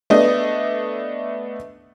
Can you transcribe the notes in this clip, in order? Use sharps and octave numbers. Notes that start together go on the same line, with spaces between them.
A3 B3 D4 D#5